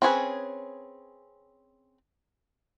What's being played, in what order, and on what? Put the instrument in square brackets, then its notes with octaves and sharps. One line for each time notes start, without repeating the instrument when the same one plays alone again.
[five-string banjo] C4 C#4 G#4 B4